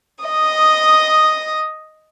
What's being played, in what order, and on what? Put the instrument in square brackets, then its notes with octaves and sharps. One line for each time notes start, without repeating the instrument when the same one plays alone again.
[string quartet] D#5 D#6